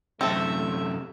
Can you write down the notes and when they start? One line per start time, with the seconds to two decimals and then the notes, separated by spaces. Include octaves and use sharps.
0.21 F#2 C3 A3 C4 A4 E5